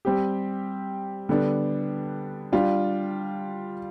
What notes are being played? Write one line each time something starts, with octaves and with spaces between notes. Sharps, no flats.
G3 C4 G4
D3 G3 B3 D4
G3 D4 F4